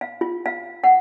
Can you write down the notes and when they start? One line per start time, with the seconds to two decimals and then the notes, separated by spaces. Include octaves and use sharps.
0.01 F5
0.21 F4
0.46 F5
0.84 F#5